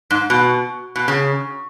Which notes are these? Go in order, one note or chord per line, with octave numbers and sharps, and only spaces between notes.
G#2
B2
B2
C#3